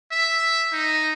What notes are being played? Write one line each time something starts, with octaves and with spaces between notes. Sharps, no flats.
E5
D#4